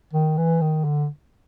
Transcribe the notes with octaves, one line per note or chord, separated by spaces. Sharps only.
D#3
E3
D#3
D3